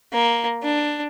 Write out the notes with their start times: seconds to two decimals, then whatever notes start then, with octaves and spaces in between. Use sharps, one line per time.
0.12 A#3
0.63 D4